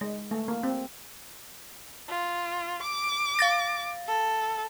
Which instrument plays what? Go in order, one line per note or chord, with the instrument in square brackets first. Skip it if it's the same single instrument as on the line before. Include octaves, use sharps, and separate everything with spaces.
[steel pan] G#3
A3
A#3
C4
[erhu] F4
D6
[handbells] F5 A6 A#6
[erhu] A4